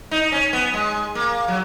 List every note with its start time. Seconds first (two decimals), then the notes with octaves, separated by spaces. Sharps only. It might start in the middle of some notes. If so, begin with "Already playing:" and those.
0.11 D#4
0.32 C#4
0.53 B3
0.74 G#3
1.15 A#3
1.48 F#3